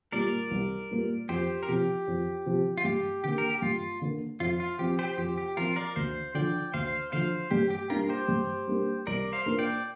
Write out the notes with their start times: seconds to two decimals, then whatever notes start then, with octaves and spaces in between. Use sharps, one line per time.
0.12 A#2 G3 A#3 A#4 D5
0.51 C2
0.91 A#2 G3 A#3
1.29 F2 G4 C5
1.63 A#4
1.68 C3 F3 C4 G4
2.08 F2
2.46 C3 F3 C4
2.78 F4
2.85 G2 G4
3.24 D3 A#3 G4
3.38 A#4
3.50 G4
3.62 G2 F4
4.01 D3 A#3
4.40 F2 F4
4.60 F4
4.79 F3 C4 G4
4.99 G4 C5
5.18 F2 G4
5.38 G4
5.57 F3 C4 F4 A#4
5.76 A#4 D5
5.96 D2 C5 F5
6.35 D3 F3 D5 G5
6.74 D2 C5 F5
7.12 D3 F3 C5 F5
7.51 G2 G4
7.70 G4
7.90 G3 A#3 D4 F4 A#4
8.09 G4 C5
8.28 G2
8.67 G3 A#3 D4
9.07 C2 A#4 D5
9.33 C5 F5
9.46 A#2 A#3 D4
9.59 D5 G5